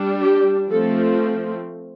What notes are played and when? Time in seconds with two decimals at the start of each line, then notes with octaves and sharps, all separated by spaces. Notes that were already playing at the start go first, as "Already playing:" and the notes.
Already playing: G3 D4
0.21 G4
0.71 F3 A3 C4 A4